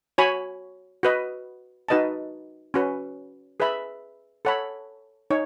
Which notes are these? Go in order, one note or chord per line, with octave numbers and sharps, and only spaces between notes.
F#4 C#5 G#5 B5
F#4 B4 D#5
D#4 F#4 B4 D#5 A5
C#4 F#4 B4
G#4 B4 E5 B5
A4 C#5 F#5 B5
D#4 C#5